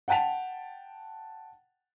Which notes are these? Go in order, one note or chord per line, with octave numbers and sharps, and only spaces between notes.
F#5 G5 A5 B6 F7